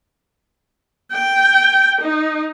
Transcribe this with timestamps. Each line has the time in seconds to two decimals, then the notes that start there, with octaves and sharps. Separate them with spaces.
1.12 G5
2.01 D#4